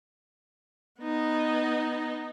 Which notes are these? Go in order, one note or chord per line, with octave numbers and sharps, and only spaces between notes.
B3 D#4